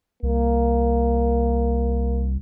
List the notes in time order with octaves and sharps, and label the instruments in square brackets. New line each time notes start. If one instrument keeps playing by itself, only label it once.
[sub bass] C2 [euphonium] A#3